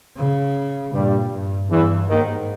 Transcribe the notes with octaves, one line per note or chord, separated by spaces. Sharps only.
C#3
G2 A#2 G3
G2
E2 G2 E3
D#2 G#2 D#3